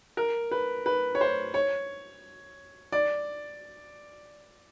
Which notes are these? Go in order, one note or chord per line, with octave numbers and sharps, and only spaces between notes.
A#4
B4
B4
C#5
C5
C#5
D5